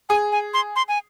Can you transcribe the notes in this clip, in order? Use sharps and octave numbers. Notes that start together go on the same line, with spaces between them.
G#4 G#5
G#5
C6
C6
G#5